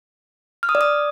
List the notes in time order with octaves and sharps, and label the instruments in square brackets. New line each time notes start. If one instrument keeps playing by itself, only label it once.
[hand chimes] F6
D#6
D5
D#6